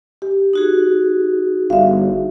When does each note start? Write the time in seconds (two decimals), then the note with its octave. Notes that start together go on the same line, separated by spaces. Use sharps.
0.22 G4
0.53 D#4 F#4 G#4
1.70 G1 E5 F5